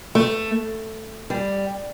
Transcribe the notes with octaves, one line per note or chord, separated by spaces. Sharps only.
A3
G3